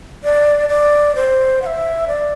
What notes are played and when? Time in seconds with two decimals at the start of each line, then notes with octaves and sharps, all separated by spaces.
0.24 D5
0.69 D5
1.15 C5
1.62 F#5
1.66 E5
2.08 D5